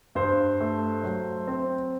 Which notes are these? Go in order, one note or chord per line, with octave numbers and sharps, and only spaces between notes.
G2 C5
A3
F#3
C4